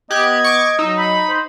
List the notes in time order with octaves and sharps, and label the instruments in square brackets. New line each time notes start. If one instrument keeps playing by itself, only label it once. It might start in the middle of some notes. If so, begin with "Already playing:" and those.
[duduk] B3 [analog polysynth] G4 F#6 [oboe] D#5 [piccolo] G#6
[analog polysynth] C#6 D6
[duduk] F#3 [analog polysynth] D#4 [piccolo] E6
[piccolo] B5
[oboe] C5